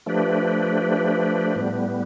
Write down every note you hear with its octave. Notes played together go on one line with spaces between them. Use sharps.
F3 A3 D4 G4 B4
A2 G3 B3